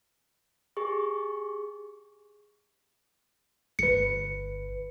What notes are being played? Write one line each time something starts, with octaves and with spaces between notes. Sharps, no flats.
G4 G#4 C#6
G1 B4 C#7